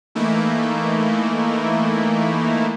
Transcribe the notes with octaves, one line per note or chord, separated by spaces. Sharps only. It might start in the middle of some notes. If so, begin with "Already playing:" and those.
E3 A3 A#3 D#4 E4